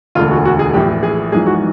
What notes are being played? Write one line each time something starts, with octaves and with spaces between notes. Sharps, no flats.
E1 D2 D3 F4
F#4
F#4
G#4
A#1 A2 E3 G4
G#4
A#1 G#2 E3 G#4
F#4